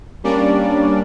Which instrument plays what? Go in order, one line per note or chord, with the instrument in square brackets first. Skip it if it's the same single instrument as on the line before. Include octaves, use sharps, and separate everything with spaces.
[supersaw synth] G3 A#3 C#4 D4 D5